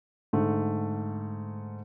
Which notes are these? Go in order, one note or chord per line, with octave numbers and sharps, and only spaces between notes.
G#2 D3 A3